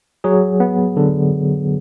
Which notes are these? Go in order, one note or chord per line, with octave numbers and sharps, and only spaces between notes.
F#3 G#4
B3
D3